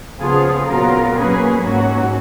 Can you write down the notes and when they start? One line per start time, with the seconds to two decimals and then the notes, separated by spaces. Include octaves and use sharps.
0.20 C#3 F3 B3 F4 G#4
0.67 A#2 F#3 B3 F4 A#4
1.15 F#3 A#3 C#4 G#4 B4
1.62 G#2 F#3 A#3 C#4 F#4